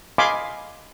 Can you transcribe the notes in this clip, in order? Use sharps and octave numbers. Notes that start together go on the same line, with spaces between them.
D#5 F5 G#5 B5 C6 D6